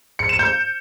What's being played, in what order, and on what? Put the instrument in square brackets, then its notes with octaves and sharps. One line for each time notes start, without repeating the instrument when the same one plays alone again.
[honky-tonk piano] C#7
E7
G6